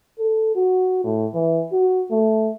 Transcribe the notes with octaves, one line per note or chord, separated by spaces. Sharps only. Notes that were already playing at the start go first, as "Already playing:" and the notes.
A4
F#4
A2
E3
F#4
A3